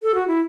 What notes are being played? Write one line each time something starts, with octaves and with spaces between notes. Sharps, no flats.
A4
F#4
E4